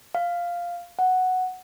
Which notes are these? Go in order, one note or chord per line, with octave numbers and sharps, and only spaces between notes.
F5
F#5